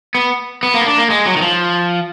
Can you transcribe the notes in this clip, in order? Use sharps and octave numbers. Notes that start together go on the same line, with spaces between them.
B3
B3
A#3
B3
D4
A#3
G#3
F#3
D#3
F3